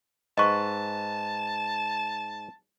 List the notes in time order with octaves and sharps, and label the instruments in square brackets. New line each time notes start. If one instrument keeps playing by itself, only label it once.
[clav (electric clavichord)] G#2 B4 [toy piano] D#5 C#6 [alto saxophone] A5